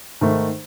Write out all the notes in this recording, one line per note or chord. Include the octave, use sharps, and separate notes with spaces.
G#2 D#3 A3